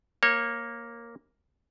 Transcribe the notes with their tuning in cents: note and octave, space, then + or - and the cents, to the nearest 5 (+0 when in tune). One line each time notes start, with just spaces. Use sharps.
A#3 +0 C#5 -25